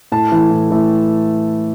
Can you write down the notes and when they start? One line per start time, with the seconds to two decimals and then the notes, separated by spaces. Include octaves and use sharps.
0.12 A2 A5
0.32 E3 A3
0.50 A2
0.70 E3 A3